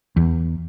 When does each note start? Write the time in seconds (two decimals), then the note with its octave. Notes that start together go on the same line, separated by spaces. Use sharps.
0.16 E2